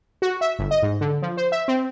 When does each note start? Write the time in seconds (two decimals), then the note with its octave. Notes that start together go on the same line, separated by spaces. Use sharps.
0.22 F#4
0.41 E5
0.59 G1
0.71 D#5
0.82 G#2
1.01 D3
1.22 F3
1.37 C5
1.52 E5
1.68 C4